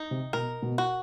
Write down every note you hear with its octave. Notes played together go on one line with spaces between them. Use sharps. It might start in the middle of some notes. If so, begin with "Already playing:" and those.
Already playing: D#4
C3
B2 A#4
B2
F#4